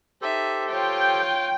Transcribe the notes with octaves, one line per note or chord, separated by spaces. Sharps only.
D#4 G4 A4 C5 E5
F4 C#5 G5